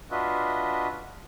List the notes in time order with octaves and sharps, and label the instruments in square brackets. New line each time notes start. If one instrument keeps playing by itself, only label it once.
[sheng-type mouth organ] D4 F4 F#4 B4 D#5 E5